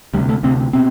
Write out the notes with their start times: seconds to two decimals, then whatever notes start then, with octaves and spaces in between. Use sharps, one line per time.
0.14 D2 G3
0.18 C3
0.29 A3
0.43 D2 C3 C4
0.73 B2 C4